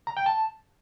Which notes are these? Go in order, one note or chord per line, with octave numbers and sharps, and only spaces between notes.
A#5
G5
A5